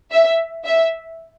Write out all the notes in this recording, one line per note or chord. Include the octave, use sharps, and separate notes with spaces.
E5
E5